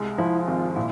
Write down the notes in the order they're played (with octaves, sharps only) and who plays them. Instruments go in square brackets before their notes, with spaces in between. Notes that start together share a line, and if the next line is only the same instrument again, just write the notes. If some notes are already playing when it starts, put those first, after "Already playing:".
Already playing: [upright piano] C2 G#3
[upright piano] F3 [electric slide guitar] E4
[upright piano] G#1 [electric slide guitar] F4
[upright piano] A#2 [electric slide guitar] E4